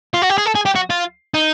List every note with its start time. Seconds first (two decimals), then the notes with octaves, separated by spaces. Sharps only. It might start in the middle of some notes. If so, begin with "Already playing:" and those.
0.14 F4
0.22 F#4
0.30 G4
0.38 G#4
0.46 A4
0.55 G#4
0.66 G4
0.75 F#4
0.90 F4
1.34 D#4